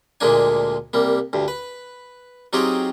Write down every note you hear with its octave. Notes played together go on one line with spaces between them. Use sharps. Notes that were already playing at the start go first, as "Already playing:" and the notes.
D2 A#2 G#3 A#3 D4 G#5
C2 G3 A#3
D2 G2
B4
F#3 C4 D#4 F4 G4 G#4